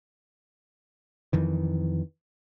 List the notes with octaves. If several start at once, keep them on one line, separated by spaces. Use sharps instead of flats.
F2 D#3 E3